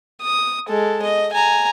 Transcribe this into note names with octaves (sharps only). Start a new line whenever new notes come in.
D#6
G#3 A4
D#5
G#5 A#5